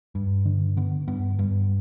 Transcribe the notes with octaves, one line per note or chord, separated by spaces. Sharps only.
G2
D3
D3 B3
G2 B3
G2